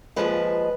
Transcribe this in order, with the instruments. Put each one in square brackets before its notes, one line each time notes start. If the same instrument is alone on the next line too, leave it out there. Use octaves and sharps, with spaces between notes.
[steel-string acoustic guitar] D#2 C#3 F3 G#3 B4